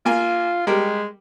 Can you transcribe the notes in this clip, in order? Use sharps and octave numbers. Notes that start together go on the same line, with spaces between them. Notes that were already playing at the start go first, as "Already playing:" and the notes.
A#3 F4 G#5
G3 G#3 G4 A#4